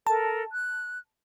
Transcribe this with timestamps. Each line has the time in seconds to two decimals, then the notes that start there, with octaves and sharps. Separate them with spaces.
0.07 A4 A#4 A5
0.52 F#6